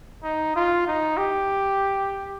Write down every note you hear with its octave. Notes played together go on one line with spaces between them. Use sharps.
D#4
F4
D#4
G4